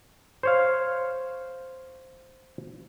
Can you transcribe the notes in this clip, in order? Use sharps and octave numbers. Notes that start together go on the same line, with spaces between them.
C5 C#5 F5